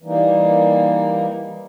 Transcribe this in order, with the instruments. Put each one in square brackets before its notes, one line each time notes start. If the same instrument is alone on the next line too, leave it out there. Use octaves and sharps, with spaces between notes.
[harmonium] E3 G3 A#3 D#4